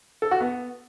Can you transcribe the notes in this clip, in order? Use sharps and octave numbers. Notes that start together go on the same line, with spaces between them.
A4
F#4
B3